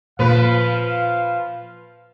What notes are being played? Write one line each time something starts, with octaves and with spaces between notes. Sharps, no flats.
A#2 F3 A#3 B4 F5